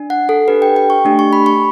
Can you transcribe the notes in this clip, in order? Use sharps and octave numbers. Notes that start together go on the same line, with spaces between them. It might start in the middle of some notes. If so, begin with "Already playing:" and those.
Already playing: D4
F#5
A4
D4 G4 B4
G5
G5
C#6
A3 D4 G4
C#6
B5
C#6